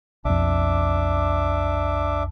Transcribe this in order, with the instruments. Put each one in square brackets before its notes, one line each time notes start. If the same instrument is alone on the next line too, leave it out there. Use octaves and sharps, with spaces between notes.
[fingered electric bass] B1 F2 [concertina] D4 E5 D6